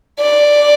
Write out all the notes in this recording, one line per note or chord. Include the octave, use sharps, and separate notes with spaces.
D5